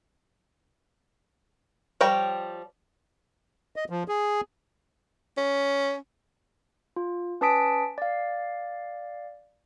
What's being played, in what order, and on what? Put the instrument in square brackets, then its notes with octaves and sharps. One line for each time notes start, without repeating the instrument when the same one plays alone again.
[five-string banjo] F3 G3 C#5 G5 A#5
[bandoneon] D#5
F3
G#4
[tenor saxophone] C#4
[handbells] F4
C#4 B4 A5 D#6 B6 D7
D5 F5